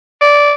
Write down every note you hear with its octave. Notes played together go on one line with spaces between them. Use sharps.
D5